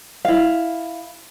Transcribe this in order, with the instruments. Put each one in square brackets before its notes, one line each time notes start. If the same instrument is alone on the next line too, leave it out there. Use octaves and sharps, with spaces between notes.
[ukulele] E4 F5